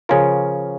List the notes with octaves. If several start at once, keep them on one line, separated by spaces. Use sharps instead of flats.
C#3 F3 C#4 F4 A#4